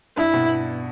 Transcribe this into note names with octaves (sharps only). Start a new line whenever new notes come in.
G2 E4
B2